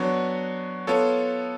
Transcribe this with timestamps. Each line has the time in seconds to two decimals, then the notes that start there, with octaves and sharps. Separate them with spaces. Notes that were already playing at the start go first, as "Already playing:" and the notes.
Already playing: F#3 B3 D4 F#4 C#5
0.87 B3 F4 A4 C#5